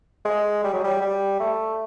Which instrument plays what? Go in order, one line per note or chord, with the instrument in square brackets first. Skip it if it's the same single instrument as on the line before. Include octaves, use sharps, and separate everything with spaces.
[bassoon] G#3
G3
F#3
G3
G3
A3